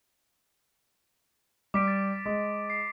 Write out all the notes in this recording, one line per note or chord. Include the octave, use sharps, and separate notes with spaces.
G3 D6 B6 D7
A6
G#3
C7